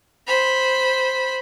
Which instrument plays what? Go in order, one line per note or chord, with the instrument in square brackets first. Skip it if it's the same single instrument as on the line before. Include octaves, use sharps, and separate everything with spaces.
[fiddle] C5 B5